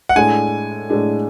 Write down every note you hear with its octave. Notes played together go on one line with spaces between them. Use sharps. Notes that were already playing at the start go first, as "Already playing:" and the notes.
F#5
A2 G#3 D4 G#5
A2 G#3 D4